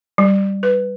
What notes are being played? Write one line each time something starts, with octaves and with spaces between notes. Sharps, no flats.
G3
B4